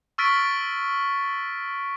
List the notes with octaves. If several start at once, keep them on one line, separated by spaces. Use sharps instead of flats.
C#6 E6 F6 A6 B6 D7